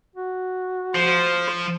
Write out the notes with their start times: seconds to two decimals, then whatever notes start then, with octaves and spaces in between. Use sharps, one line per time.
0.16 F#4
0.95 F3 C5